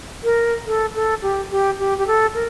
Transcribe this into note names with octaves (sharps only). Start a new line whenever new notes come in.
A#4
A4
A4
G4
G4
G4
G4
A4
A#4